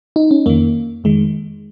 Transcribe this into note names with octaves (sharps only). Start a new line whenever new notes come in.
D#4
C#4
F2 D#3 A#3
F2 D#3 G#3